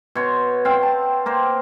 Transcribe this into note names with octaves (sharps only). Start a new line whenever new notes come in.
B2 C#5 C6
C4 F5 G5
A5
A#3 A#4 C5